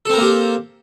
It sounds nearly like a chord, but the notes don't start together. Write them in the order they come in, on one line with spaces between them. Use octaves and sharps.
A4 C4 A#4 A#3 G4